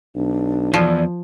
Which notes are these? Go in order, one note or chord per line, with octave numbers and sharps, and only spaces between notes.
B1 D4
E2 F3 D5